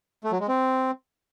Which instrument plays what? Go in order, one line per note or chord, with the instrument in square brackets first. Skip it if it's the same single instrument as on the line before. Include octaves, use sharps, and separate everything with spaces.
[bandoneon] A3
F#3
G#3
C4